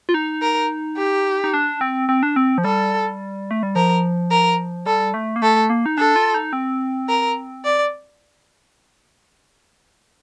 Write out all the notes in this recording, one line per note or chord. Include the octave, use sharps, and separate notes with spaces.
F4
D#4
A#4
G4
D#4
D4
C4
C4
D4
C4
F3
G3 A4
A3
G3
F3 A#4
A#4
G3 A4
A3
A#3
A3 A4
A#3
D#4
D4 A4
F4
D#4
C4
A#4
D5